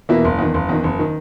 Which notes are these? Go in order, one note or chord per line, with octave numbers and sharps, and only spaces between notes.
E2 B2 A#3 E4
F#1
E2 D#3
F#1
E2 D#3
F#1
D#3